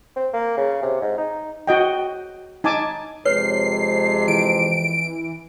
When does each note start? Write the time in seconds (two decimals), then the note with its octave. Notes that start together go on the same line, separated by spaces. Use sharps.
0.16 C4
0.33 A#3
0.57 C#3
0.82 C3
1.01 G#2
1.18 D#4
1.67 F#4 D#5 G5
2.64 D#4 G#5 A5 D6
3.25 F2 C3 G#3 B4 C#5 C7
4.28 E3 D7